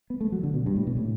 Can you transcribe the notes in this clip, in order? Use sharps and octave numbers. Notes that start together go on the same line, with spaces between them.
B3
A3
F#3
D3
B2
G2
A2
B2
A2